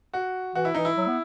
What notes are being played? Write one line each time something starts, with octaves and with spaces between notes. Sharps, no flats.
F#4
E3 F#4
E4
E3 D#4
E4
F#3
B3